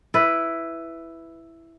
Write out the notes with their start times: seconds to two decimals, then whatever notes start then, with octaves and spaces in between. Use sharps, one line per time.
0.14 E4 B4